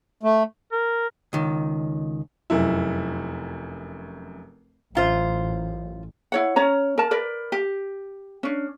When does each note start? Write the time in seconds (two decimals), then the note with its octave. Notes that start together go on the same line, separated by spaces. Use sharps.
0.23 A3
0.72 A#4
1.33 C#2 D#3
2.50 F1 F#2 E4
4.95 A1 F#2 F4 C5
6.32 E4 C#5 F#5
6.56 C#4 C#5 A#5
6.98 A#4 A5
7.11 A#4 B4 D5
7.52 G4
8.43 C#4 D4